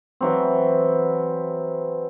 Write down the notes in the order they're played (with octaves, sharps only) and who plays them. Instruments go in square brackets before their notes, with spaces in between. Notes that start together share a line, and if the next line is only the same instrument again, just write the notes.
[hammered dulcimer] E3 F#3 C4